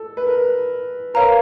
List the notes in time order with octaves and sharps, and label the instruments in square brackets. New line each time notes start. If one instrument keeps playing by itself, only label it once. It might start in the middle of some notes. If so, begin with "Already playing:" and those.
Already playing: [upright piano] A4
B4
A#4
[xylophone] A#4 C#5 F5 A#5 [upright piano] B4